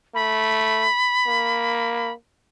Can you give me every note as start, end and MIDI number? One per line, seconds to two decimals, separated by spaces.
0.15 0.86 57
0.15 2.12 83
1.27 2.13 58